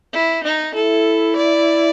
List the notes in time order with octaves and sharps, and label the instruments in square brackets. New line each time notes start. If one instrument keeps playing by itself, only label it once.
[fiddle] E4
D#4
[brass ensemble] E4 [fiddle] A4
[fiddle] D5